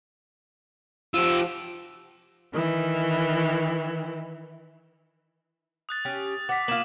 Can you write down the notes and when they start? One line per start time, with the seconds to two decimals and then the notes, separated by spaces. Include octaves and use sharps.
1.14 F3 F4 G4 E6
2.54 D#3 E3
5.89 D#6 F#6 A6
6.05 C#4 G4
6.49 F#5 D6 B6
6.68 A#3 F4 E7 F#7